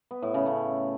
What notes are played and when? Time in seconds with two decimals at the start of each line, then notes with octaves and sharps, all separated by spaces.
0.11 B3
0.22 A2
0.34 C#3
0.46 A3